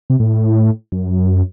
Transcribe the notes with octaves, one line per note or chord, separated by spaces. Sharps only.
C3
A2
F#2